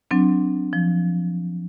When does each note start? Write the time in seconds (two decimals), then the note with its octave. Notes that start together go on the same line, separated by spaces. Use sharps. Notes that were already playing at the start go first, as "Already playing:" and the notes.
0.11 F#3 C4 D4
0.73 F3